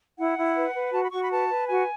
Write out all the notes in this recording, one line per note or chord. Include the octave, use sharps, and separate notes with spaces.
E4 F#5
E4
B4
B4
F#4 A5
B5
F#4 C#6
B5
B4 A5
B4
F#4 G#5